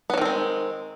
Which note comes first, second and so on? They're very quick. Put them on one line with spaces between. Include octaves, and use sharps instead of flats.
B3 F#3 D#3 C4 G#3